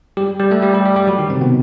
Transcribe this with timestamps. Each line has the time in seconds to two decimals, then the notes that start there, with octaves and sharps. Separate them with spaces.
0.17 G3 G4
0.39 G3 G4
0.51 A3 A4
0.62 G3 G4
0.74 G3 G4
0.86 G3 G4
0.96 G3 G4
1.07 F#3 F#4
1.19 D#3 D#4
1.30 C3 C4
1.41 B2 B3